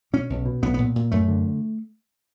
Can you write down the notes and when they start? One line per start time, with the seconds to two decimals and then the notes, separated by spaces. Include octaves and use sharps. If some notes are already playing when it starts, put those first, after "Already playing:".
0.13 B2 C#4
0.30 B1
0.45 B2
0.62 B1 B3
0.74 B3
0.78 A#2
0.96 A#2
1.12 F#2 A3
1.28 D3